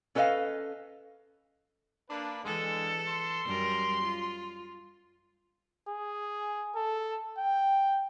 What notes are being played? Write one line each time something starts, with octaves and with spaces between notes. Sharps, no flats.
C#4 A4 B4 D#5 F5
A#3 D4 B4
D3 E3 G#3 A4
C6
F#2 G3 A#4
F4
G#4
A4
G5